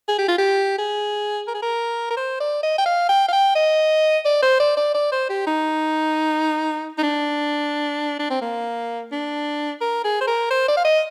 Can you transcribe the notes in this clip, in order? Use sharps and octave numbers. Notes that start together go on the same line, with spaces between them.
G#4
G4
F4
G4
G#4
A#4
G#4
A#4
A#4
C5
D5
D#5
G5
F5
G5
F5
G5
D#5
D5
C5
D5
D5
D5
C5
G4
D#4
D#4
D4
D4
C4
A#3
D4
A#4
G#4
C5
A#4
C5
D5
F5
D#5